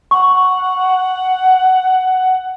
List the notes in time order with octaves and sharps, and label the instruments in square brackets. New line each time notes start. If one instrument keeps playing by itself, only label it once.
[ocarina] F#5 [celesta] C#6